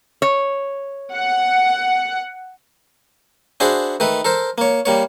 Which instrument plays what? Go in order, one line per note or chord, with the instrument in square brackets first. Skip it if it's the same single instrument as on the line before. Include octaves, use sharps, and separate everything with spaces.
[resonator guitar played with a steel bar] C#5
[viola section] F#5
[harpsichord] D4 E4 F#4 G#4 C5
D#3 A3 B4
A4 A#4 C5
A#3 C#5
G3 A#3 C#5